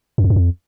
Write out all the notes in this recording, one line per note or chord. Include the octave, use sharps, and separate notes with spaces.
F#2
F2
F#2
F2